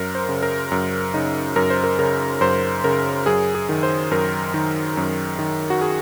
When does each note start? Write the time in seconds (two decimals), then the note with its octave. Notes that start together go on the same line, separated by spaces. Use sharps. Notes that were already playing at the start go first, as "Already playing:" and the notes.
Already playing: F#2 A#4
0.15 C5
0.29 C#3
0.43 A#4
0.72 F#2
1.14 C#3 D#4
1.56 F#2 A#4
1.70 C5
1.84 A#4
1.99 C#3 A#4
2.41 F#2 C5
2.84 C#3 A#4
3.26 F#2 G#4
3.55 G#4
3.69 D#3
3.83 C5
4.11 F#2 A#4
4.54 D#3
4.97 F#2
5.39 D#3
5.70 F#4
5.81 G#4